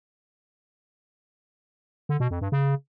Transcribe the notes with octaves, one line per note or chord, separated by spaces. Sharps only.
D3
B2
F2
G2
C#3